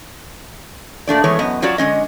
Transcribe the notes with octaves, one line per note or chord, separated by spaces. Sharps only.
A#2 A3 D4 D5
E3 G#3 A3 B3 C#5
F#2 B3 D#5
F#3 C#4 F4 F#4 D5
D3 G#3 C#4 D#5